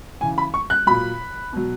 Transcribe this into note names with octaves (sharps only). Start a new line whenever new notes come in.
C#3 E3 G#5
B5
C#6
F#6
A#2 F#3 B5
B2 F#3